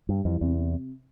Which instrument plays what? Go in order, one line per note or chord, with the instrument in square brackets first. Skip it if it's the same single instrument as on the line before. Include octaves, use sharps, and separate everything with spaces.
[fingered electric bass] G2 [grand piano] G3
[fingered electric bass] F2 [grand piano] E3
[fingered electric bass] E2 [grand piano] C3
[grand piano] C3